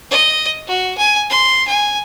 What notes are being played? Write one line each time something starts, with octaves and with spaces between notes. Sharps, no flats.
D#5
F#4
G#5
C6
G#5